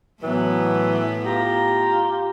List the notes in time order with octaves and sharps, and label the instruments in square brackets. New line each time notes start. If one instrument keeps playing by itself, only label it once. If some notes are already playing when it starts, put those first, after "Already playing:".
[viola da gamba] A2 B3 [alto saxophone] E3 [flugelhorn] F#3
[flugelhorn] F4 [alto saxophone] G4 [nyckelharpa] A#5